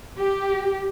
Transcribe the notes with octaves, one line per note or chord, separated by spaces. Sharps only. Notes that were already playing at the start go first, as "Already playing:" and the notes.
G4